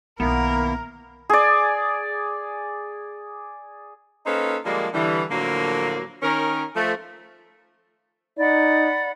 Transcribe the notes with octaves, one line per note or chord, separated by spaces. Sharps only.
B1 D#3 A#3 B3 E4 A#4
G#4 D5
A#3 C#4 D#4 A4 B4 C5
D3 F3 G3 G#3 A#3
D3 E3 G3
A2 D3 F3 F#3 A#3
D#3 C#4 A#4
F3 A3
D#4 D5 F#5 B5